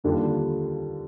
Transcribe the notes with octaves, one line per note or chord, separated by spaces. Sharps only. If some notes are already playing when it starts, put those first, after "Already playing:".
D#2 D3 G3 D4 F4